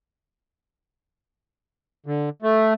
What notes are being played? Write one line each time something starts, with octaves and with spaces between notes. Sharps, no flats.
D3
A3